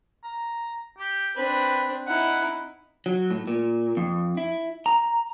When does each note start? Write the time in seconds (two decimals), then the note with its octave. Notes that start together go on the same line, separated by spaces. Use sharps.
0.24 A#5
0.98 G4
1.36 C4 D4 B4
2.07 D#4 E4 F#5
3.06 F#3
3.31 A2
3.47 A#2
3.97 F2
4.37 E4
4.86 A#5